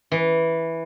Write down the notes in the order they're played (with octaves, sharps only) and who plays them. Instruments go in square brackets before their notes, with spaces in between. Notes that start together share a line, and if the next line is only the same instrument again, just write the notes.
[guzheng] E3